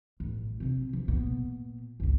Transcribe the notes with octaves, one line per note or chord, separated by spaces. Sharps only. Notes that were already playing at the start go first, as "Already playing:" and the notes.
A1
C3 C4
F3
A#2 B3
G#1 C#2